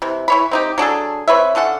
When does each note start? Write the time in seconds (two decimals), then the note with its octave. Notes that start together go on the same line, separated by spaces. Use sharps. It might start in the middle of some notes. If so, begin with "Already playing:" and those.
0.02 C3 E3
0.28 E3 C#5 B5
0.51 C4 D#4 G4
0.78 F#3 D4 G#4 A4
1.28 C4 B4 C#5 E5
1.55 D3 C#4 A4 F#5